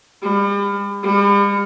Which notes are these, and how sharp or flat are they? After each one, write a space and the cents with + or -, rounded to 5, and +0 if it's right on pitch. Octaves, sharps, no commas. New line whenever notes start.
G3 +40
G3 +45